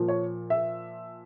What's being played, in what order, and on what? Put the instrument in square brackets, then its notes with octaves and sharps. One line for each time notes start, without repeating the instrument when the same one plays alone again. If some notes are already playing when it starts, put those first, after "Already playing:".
Already playing: [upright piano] A#2 F3
C#5
E5